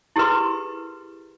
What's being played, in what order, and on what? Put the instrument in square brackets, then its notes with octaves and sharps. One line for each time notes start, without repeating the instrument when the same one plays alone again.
[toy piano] E4 G4 G#4 A#4 B4 C6